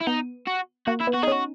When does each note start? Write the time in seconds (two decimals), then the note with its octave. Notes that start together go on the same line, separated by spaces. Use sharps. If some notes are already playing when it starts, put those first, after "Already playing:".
0.01 E4
0.07 B3 D#4
0.47 F#4
0.87 A#3 F#4
1.01 E4
1.07 B3
1.14 F#4
1.23 D#4 G#4
1.27 C#4 F#4